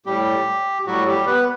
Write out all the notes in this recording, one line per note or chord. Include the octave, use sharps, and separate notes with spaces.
A2 G3 G4
A2 F#3 G3 F#4
G3 G4
B3 B4